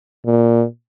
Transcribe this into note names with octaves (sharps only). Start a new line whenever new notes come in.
A#2